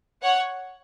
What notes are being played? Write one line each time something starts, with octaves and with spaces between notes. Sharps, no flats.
C#5 F#5